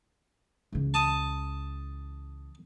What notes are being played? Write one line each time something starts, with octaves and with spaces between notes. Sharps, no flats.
C#2 E3
A5 D#6